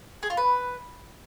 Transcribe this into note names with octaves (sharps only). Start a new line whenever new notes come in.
G#4
F4
B4